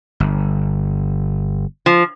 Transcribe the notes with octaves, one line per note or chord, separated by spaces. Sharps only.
G1
F3